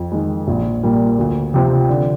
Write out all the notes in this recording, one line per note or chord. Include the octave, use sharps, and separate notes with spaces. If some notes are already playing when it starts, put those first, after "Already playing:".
Already playing: F2
D#3 G#3
A#1
A#2 G3 A#3
D2
C3 F3 C4
D3